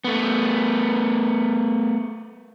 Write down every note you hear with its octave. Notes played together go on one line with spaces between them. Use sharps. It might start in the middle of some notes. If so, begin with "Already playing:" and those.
A3 B3